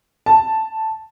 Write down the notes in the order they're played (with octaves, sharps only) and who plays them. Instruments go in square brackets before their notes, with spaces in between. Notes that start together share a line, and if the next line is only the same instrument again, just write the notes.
[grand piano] A5